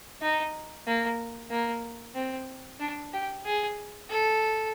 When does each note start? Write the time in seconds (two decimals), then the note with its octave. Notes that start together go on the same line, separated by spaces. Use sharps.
0.21 D#4
0.86 A#3
1.50 A#3
2.15 C4
2.80 D4
3.13 G4
3.45 G#4
4.09 A4